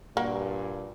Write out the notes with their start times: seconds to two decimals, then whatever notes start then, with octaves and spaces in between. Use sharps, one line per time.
0.17 G2 A#2 A#3 F#4